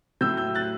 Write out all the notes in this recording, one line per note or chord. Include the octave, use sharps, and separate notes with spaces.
A2 F#3 A3 E6 G6
E6 G6
F#6 A6